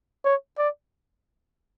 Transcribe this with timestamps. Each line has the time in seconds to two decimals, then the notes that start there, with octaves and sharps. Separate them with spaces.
0.25 C#5
0.58 D5